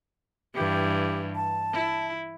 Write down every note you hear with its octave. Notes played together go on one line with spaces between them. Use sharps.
G2 E3 G4
A5
E4